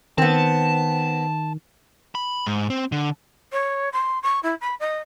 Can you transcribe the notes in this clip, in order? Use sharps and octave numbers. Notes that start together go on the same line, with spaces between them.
D#3 B3 C4 A5
B5
G#2
C4
D3
C#5
C6
C#6
E4
B5
D#5